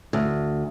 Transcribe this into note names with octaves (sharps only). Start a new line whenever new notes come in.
D2